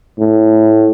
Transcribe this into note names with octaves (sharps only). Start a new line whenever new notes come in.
A2